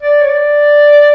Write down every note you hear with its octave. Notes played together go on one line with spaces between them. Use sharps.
D5
C#5
D5